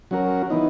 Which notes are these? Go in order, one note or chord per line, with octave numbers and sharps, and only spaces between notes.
F#3 C#4 F#4 A#4
E3 B3 D#4